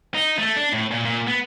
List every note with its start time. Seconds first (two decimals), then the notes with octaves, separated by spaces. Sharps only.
0.15 D#4
0.38 A3
0.57 D4
0.73 A2
0.91 A#2
1.05 A#2
1.27 B3